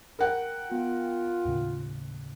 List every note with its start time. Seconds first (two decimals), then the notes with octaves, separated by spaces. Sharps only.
0.19 A#4 F#5 G5
0.71 B3 F4
1.45 D#2 A2 C#3